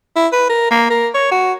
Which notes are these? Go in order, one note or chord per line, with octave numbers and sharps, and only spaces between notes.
E4
B4
A#4
A#3
A#4
C#5
F#4